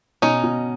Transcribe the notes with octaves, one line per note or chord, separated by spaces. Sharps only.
B2 C#4 D#4
B2